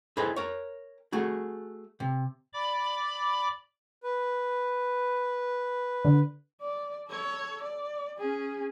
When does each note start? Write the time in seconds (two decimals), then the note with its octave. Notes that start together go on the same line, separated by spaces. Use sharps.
0.17 E4 G#4 A4 B4 C5 D#5
0.36 A#4 C#5
1.12 A3 F#4 G#4
2.00 C3
2.53 D5 B5 D6
4.03 B4
6.05 D3
6.61 D5
7.08 A4 C#5
7.62 D5
8.18 C#4 G#4